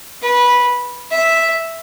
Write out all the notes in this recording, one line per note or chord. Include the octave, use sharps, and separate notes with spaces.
B4
E5